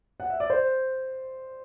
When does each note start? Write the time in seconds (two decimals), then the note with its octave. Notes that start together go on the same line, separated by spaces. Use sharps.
0.20 F#5
0.30 E5
0.40 D5
0.50 C5